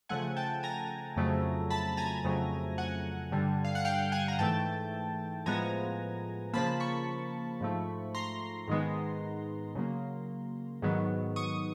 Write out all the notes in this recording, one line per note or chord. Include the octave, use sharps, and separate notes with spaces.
C#3 F3 A3 F#5 G#5
G5 A5
G#5 A#5
F2 C#3 F#3 A3
A5 B5
G#5 A#5
F2 C#3 F#3 A3
F#5 G#5
G2 D3 G3
F5
F#5
F5 G5
F#5 G#5
A#5
G#2 E3 A3 G5 A5
A2 F3 G#3 B3 G#5 A#5
C#3 F3 A#3 A5 B5
B5 C#6
G#2 F3 A3
A#5 C6
G#2 D#3 G#3 B3
C#3 F#3 A#3
G#2 D#3 F#3 B3
C#6 D#6